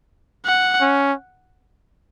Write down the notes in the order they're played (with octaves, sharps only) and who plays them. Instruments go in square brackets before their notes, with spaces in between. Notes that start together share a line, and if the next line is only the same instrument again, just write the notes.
[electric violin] F#5
[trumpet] C#4